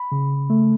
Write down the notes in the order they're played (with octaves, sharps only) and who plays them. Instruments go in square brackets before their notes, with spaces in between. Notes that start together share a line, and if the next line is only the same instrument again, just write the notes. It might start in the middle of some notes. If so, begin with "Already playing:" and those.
Already playing: [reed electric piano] B5
C#3
A3